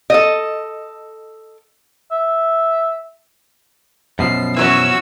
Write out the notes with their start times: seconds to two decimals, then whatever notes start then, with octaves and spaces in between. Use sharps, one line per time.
0.10 A4 D#5
2.11 E5
4.19 F#2 B2 F3 C7
4.57 E3 F#3 C#4 F#4 E6